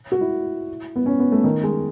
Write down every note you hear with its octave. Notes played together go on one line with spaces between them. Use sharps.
F#4
E4
B3
C#4
B3
A3
D#3
G#3